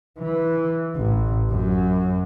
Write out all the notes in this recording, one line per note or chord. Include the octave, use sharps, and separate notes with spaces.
E3
A1
F#2